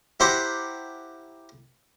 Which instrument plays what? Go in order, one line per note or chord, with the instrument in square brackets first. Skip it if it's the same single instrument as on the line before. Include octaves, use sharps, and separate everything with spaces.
[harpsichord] E4 G4 C5 F#5 A#5 D6